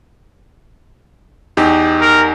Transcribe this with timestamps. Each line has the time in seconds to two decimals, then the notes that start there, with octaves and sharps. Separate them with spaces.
1.57 E2 D#4 G4
2.01 A#4